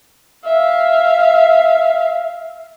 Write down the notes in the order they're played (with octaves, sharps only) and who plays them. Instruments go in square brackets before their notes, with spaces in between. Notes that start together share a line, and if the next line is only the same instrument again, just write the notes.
[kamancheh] E5 F5